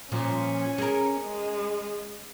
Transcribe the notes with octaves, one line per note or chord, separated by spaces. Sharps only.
A#2 F3 C#4
G#4 A#4
G#3